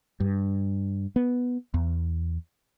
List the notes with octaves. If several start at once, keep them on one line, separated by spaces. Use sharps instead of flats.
G2
B3
E2